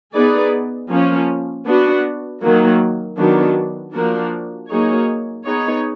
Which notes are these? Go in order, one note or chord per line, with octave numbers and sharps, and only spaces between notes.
B3 D#4 G#4 B4 D5
F3 A#3 C#4
B3 D4 F#4
D#3 F#3 A#3
D#3 F#3 B3 D4
F3 A#3 D4 F#4 A#4
F#3 A#3 D#4 G#4 C#5
B3 D#4 G#4 C#5